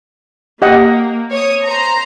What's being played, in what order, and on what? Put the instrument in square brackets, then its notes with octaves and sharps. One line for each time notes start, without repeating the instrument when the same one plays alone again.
[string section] A#3 [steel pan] G4 D#5 F#5
[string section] C#5 D#6
C5 A#5